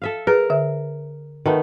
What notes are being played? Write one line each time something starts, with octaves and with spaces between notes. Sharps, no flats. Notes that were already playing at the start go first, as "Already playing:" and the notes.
A4 E5 F5
G#4 A#4 B4
D3 E5
D#3 A3 B3